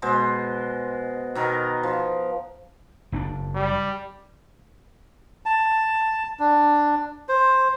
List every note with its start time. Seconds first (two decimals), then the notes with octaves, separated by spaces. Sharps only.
0.02 B2 G#3 C5
1.35 B2 D#3 A#4 D#5
1.83 F3
3.12 F#1 C4 D4
3.55 G3
5.46 A5
6.39 D4
7.29 C5